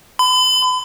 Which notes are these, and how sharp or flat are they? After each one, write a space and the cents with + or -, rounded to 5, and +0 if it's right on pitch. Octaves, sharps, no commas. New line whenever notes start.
B5 +40